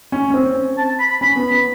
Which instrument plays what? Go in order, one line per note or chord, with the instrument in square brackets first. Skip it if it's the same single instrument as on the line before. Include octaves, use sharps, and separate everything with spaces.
[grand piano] C#4
C#4
C4
[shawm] A5
B5
B5
[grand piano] C#4 [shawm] B5
[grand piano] B3
B3